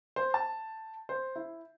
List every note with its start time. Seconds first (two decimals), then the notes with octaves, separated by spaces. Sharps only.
0.16 C5
0.34 A5
1.09 C5
1.36 E4